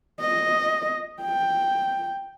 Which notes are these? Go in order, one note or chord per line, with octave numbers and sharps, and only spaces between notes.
D#5
G5